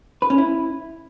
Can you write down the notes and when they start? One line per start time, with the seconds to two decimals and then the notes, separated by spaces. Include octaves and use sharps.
0.22 B4
0.30 C#4
0.38 E4